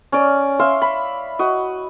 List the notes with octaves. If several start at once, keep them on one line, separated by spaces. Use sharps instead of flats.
C#4 D5
E5 F5 C6
B5
F#4 D#5